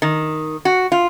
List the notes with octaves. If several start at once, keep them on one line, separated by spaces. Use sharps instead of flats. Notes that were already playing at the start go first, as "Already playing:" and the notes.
D#3
F#4
F4